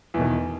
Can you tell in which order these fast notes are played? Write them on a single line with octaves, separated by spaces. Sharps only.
E2 B2 D#3